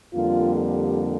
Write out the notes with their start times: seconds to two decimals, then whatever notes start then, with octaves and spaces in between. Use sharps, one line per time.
0.13 F2 D3 G3 A#3 F4
0.55 G4